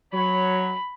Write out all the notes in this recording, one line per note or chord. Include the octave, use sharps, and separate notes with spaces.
F#3 C#5 B5